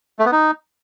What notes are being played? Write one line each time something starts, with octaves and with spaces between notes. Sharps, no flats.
A3
B3
D#4